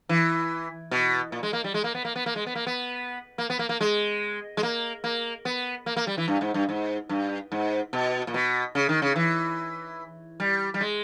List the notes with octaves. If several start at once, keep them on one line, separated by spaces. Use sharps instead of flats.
E3
B2
A#2
G#3
A#3
G3
G#3
A#3
B3
A#3
B3
A#3
G#3
B3
A#3
B3
A#3
B3
A#3
A#3
G#3
G#3
A#3
A#3
B3
A#3
A#3
G3
E3
G2
G#2
G2
G#2
G2
G#2
B2
A#2
B2
C#3
D#3
C#3
E3
G3
G3
G#3